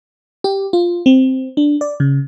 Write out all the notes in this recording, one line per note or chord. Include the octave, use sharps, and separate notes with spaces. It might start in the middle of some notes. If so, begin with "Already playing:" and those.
G4
F4
C4
D4
D5
C#3